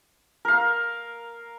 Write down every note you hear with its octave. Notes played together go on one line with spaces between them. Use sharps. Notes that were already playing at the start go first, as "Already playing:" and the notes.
A#4 F5